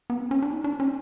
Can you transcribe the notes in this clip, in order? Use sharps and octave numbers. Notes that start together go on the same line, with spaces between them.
B3
C4
C#4
D4
D#4
D4
C#4